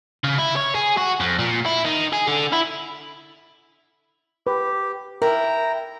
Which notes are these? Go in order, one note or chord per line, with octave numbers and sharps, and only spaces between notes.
C#3
E4
C#5
G#4
F#4
F2
A#2
E4
D#3
G#4
D3
E4
G4 B4
E4 A#4 G5 A#5